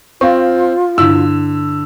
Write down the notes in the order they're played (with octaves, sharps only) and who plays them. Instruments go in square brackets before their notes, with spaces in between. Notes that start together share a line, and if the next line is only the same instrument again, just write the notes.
[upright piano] C4 [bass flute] F4 [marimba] F5 C#6
[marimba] G2 E4 [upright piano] D3 E6